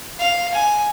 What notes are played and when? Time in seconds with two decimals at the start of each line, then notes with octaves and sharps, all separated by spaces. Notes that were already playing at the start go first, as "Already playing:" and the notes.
0.19 F5
0.54 G#5